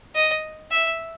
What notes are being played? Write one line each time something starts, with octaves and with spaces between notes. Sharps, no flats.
D#5
E5